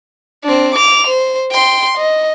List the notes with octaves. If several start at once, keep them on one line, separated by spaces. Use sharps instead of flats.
C4 D4
D6 F7
C5
G5 C6
D#5